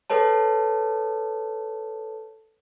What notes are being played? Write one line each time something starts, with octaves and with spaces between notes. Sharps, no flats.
A4 B4 C#5 A5